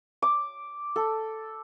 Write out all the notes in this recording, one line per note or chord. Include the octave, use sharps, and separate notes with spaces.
D6
A4